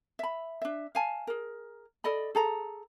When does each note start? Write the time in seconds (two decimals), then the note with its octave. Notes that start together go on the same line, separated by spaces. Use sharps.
0.19 E5 B5
0.62 D4 E5
0.95 F5 G#5 A5
1.27 G#4 A#4
2.04 A4 D5 D#5 B5
2.35 G#4 A4 A#5